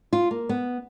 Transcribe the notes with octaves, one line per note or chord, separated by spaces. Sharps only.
F4
A#3
B3